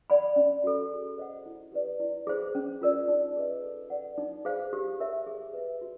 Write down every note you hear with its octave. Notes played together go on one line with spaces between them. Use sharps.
D5 F#5 B5
C#4
F#4 A4
G#4
C5 D#5 F#5
E4
G4 B4 D5
E4
G#4 C5
C#4
F4 A#4 D5
D#4
G#4 B4 D#5
A4
D5 F#5
D#4
G#4 C5 F5
G4
A#4 C#5 E5
G#4
B4 E5
F#4